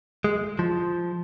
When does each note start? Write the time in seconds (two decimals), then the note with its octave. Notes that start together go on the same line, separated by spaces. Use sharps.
0.24 G#3
0.59 F3